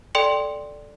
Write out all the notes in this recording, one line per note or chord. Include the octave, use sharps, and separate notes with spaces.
A4 D5 G5 C6 C#7